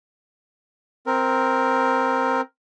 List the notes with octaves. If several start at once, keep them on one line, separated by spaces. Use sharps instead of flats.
C4 A#4